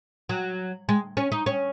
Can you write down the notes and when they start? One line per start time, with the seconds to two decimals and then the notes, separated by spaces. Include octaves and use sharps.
0.29 F#3
0.89 G#3
1.17 C#4
1.32 D#4
1.46 C#4